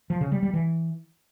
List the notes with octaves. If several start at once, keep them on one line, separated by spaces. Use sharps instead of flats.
F3
C#3
G3
G3
E3